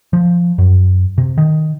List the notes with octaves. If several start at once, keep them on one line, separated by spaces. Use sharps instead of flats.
F3
F#2
C3
D#3